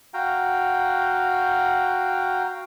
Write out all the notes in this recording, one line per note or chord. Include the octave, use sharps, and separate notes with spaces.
F#4 F5 G5 A#5